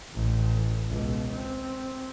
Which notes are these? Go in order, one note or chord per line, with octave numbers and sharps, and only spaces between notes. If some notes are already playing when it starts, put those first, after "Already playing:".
A1
C#2 B2
C4